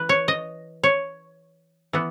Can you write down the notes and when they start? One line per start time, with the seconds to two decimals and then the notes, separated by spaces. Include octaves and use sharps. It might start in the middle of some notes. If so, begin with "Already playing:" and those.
Already playing: E3 B4
0.09 C#5
0.28 D#5
0.84 C#5
1.93 E3 B3